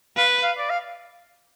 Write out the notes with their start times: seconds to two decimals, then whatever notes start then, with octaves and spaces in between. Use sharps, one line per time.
0.17 B4 F5
0.43 F5
0.58 D5
0.70 F5